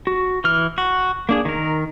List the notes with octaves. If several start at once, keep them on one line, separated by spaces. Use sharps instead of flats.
F#4
E3 F6
F#4
A#3 D4 G#4
D#3 A#4